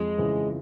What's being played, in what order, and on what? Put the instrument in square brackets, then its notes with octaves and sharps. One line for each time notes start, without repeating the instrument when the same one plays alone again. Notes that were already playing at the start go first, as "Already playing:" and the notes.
Already playing: [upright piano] F2 [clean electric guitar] G#3
[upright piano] C#3 E3